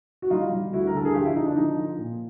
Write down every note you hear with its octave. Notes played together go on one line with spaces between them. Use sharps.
F#4
G3 D#4 F4
G3
D2 E4 F#4
A#4
D3 A4
G#4
F3 F4 G4
D4 E4
D3 D#4
D4
F3 D#4
F3
A#2